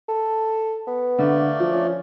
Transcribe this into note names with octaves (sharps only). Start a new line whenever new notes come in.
A4
B3
D3 A3 A#3 D5
F3
C#4